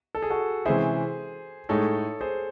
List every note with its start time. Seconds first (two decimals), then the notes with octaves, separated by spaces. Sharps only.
0.15 A4
0.22 G#4
0.30 F#4 A4
0.65 C3 E3 G#3 C#4 E4 G#4 C5
1.69 A2 G#3 D#4 A4 C#5
2.21 G#4 C5